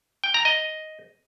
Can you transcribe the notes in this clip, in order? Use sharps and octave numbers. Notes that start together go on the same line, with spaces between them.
G5
A#5
D#5